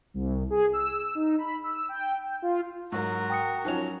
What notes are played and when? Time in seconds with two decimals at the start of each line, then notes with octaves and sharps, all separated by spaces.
0.14 C2
0.50 G#4
0.73 E6
1.15 D#4
1.38 B5
1.64 E6
1.89 G5
2.24 G5
2.42 F4
2.92 G#2 F#3 F#4 A#4
3.30 G5 D#6 C#7
3.65 F3 F#3 C#4 D#4 F7